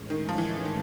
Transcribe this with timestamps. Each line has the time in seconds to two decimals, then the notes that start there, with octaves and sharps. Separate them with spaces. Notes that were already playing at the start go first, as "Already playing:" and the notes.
Already playing: A2 E3 G#3 C#4
0.10 D#3
0.29 F3
0.38 E3
0.65 D#3